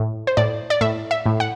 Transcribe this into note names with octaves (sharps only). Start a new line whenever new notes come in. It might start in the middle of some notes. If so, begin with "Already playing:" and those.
Already playing: A2
C5
A2 D5
D5
A2 E5
E5
A2
F#5